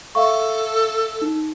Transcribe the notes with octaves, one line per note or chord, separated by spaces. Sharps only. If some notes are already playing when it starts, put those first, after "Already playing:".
A4 E5 F5 C#6
D#4